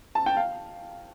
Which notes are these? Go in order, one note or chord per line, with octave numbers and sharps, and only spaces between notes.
A5
G5
F5